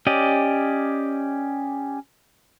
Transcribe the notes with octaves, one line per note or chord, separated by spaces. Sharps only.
C#4 G4 D5 D#5